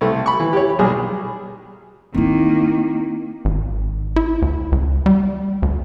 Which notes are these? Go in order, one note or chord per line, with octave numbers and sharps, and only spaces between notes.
C2 A3
B5 C#6
E3
G4 C#5
B1 G3 G#4
D#3 A#3 C4 E4
G#1
E4
D2
C#2
G3
D2